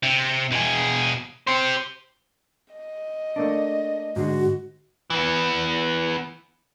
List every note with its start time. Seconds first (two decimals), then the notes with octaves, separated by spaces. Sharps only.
0.03 C3
0.52 B2 G#4
1.47 G4 C5
2.73 D#5
3.36 A3 A#3 D4
4.16 G#2 D3 G#3 F#4
5.10 E3 B3